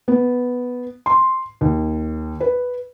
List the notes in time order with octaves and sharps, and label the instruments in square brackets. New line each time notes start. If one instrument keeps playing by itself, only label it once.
[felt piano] B3
C6
D#2
B4